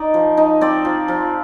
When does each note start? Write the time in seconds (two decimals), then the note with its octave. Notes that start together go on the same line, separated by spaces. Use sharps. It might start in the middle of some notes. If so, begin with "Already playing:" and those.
Already playing: D#4 D5
0.14 F3
0.37 D#4
0.61 C4 D5
0.85 F3
1.08 F3